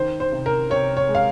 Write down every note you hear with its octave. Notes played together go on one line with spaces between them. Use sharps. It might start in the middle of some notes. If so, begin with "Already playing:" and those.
Already playing: D#3 C5
C5
C3
A#4
C3 C#5
C#5
G#3
F5